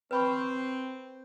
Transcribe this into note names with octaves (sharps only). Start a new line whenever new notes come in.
C4 B4 B5 C#6